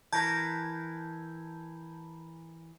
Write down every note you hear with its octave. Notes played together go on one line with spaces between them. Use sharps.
E3 A#4 A5 G6 G#6